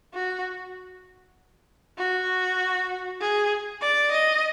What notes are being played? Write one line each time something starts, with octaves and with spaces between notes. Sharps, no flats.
F#4
F#4
G#4
D5
D#5